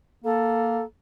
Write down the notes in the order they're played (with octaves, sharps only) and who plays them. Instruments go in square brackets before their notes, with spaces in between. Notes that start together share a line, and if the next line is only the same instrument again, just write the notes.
[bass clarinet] A#3 [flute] A4